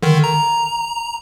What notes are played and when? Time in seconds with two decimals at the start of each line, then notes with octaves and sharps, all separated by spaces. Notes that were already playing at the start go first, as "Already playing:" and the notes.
0.03 D3 D#3
0.24 A#5